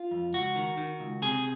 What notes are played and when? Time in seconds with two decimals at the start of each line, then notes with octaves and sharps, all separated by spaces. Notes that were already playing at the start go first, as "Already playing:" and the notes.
Already playing: F4
0.11 F2
0.33 C#2 F#4
0.56 D#3
0.77 D#3
1.00 C#2
1.22 C3 G#4